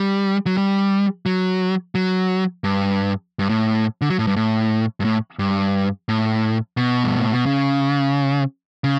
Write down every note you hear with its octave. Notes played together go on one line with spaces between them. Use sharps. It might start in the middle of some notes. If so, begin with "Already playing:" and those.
Already playing: G3
F#3
G3
F#3
F#3
G2
G2
A2
D3
F#3
A2
G2
A2
G2
A2
G2
A2
B2
G2
A2
B2
C#3
C#3